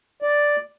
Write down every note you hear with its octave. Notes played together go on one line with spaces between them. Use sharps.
D5